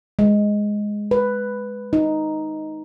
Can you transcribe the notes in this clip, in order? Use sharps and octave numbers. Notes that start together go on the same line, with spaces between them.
G#3
B4
D#4